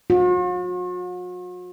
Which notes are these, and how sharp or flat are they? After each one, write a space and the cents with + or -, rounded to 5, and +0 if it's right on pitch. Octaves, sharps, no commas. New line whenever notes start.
F#4 -45